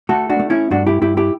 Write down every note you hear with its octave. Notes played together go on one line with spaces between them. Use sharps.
A3 F#4 A4
D4 F#4
A3
C#4 E4
G2 D4 F#4
E4 G4
G2 E4 G4
E4 G4